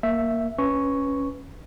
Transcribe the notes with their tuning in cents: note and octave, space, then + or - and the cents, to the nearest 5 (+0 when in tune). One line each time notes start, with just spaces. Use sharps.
A#3 +0 E5 +0
C#4 +0 B4 +0 C#6 +0